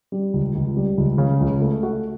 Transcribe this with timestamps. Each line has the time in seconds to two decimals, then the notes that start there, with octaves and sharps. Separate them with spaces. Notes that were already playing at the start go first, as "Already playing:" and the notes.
0.12 G3
0.34 C#2
0.55 C#2
0.77 G3
0.98 C#2
1.18 C#3
1.41 C#2
1.61 A3
1.83 F#4